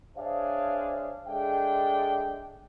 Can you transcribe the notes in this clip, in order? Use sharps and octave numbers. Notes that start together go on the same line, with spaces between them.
D4 G#4 C5 C#5 E5 F5
G#3 D4 G#4 A4 E5 G5